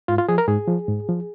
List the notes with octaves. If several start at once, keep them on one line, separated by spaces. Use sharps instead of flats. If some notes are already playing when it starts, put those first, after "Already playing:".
G#2 F4
F4
F3 G#4
A#4
G#2 G#4
F3
G#2
F3